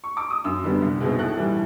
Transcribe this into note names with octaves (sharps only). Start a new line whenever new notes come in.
C#6
D6
D#6
F#2 E6
D3 G3 B3
C2
B2 G#3 C4 D#4
A2 F#6
E3 G3